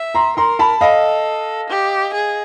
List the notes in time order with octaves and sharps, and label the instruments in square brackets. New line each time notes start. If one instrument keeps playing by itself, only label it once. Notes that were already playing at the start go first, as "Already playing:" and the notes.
Already playing: [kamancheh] E5
[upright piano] A#5 C6
[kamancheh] A#4 [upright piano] A#5 C6
[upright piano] A5 B5
[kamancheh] A4 [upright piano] D#5 F5
[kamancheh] G4
G#4